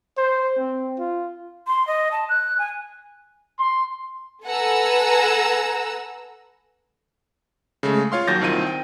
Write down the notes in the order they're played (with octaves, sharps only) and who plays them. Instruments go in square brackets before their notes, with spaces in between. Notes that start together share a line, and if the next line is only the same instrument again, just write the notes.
[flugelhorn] C5
C4
F4
[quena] C6
D#5
A5
F#6
G#5
[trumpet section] C6
[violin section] A4 B4 F#5 G#5 A#5 E6
[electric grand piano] C#3 G#3 A3
F4 C#5 F5 C6
D#2 F#3 G6 A6 A#6
C2 D#3 C4 F4 D#7
G5